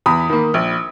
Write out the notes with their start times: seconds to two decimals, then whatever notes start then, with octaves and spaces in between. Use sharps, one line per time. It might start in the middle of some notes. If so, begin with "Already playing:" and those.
0.06 E2 B5 D#6
0.30 D#3 A#3
0.54 A#1